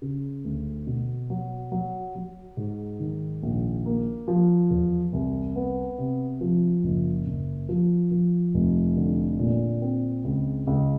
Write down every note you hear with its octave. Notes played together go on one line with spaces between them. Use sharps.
C#3
D2
B2
F#3
F#3
F#3
G#2
D#3
A#1
A#3
F3
E2
C2
B3
C3
F3
F#1
F#1
F3
F3
F1
D3
A#2
C4
C#2
C#2